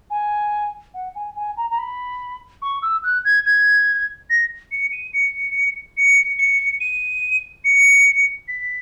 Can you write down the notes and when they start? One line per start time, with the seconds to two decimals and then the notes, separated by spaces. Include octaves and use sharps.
0.10 G#5
0.94 F#5
1.15 G#5
1.36 G#5
1.57 A#5
1.70 A#5
1.78 B5
2.62 C#6
2.82 E6
3.04 F#6
3.25 G#6
3.45 G#6
4.30 A#6
4.71 C#7
4.92 D#7
5.13 C#7
5.97 C#7
6.39 C#7
6.81 D#7
7.64 C#7
8.48 B6